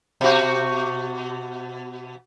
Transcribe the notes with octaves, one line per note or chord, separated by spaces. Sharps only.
B2 F#4